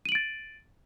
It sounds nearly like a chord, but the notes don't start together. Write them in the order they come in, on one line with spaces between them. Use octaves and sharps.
D#7 F#7 D7 A6